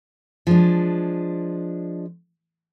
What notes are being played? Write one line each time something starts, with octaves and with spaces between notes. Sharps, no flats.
F3 G#3 D4